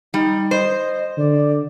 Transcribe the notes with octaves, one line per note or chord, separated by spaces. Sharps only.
G3 D#4
C5 D#5
D3 D5